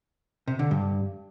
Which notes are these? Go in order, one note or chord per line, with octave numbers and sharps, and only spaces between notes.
C3
D3
G2